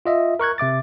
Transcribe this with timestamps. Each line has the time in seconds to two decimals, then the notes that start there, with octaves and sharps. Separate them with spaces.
0.06 F4 D#5 E5
0.40 A#4 C#6 F#6 G#6
0.58 C3 E5 D6 A6